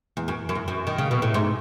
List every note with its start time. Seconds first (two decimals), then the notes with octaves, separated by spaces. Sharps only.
0.17 E2
0.28 F#2
0.49 F#2
0.55 E2
0.68 F#2
0.87 D#3
0.98 C#3
1.11 B2
1.22 A2
1.34 G#2